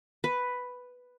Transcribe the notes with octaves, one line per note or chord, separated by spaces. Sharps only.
B4